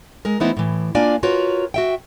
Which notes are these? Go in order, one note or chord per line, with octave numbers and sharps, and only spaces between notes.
G#3 A#4
E3 A3 B3 D#4 E4 C5
A2 E3
A#3 D4 F4 D5 G#5
F4 F#4 A#4 B4 C#5
F#4 E5 G5